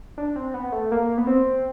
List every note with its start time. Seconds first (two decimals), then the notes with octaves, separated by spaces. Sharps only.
0.18 D4
0.36 C4
0.54 B3
0.72 A3
0.92 A#3
1.18 B3
1.27 C4